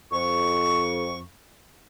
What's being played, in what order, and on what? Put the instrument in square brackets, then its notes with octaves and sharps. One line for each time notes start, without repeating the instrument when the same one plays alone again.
[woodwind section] F2 C#6